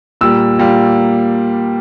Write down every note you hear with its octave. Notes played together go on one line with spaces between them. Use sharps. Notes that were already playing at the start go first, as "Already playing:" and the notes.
A#2 G3 A#3 E6
A#2 G3 A#3